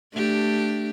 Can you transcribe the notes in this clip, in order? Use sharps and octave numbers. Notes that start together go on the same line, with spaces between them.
A3 D4 G4